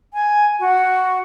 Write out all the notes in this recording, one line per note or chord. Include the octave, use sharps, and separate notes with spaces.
G#5
F#4